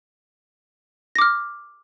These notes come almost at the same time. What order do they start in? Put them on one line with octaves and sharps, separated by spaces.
A#6 D6 F6